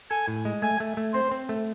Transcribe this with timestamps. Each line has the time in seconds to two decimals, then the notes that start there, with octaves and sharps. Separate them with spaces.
0.10 A4 G#5
0.28 A2
0.45 G#3
0.62 A3 G#5
0.80 A3
0.97 A3
1.14 C4 C5
1.31 C4
1.49 A3